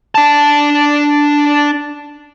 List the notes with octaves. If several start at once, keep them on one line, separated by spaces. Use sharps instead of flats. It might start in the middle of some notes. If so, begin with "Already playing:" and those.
D4 A5